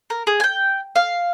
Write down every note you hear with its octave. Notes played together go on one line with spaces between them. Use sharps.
A#4
G#4
G#5
G5
F5